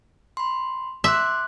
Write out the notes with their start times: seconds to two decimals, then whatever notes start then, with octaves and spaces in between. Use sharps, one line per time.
0.37 B5 C6
1.04 E5 C6 D6 F#6